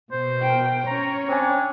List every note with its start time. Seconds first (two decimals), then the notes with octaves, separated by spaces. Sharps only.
0.12 B2 C5
0.42 A#4 G5
0.87 C#4 C#5 A#5
1.28 C4 D4 G#5